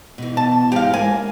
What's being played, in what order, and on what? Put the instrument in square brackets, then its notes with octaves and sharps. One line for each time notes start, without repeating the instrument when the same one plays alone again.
[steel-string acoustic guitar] B2 E3
[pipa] A5
[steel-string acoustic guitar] G#2 E3 G#3 [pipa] G4 F5
[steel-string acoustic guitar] A#3 C#4 [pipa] G#5